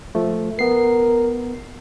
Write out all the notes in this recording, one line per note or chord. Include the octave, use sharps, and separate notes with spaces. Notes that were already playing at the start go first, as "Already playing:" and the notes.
F3 A3
B3 A#4 C7